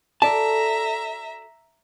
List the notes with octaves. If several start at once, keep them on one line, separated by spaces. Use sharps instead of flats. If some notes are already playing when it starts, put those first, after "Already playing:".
F#4 A4 D5 E5 A5 A#5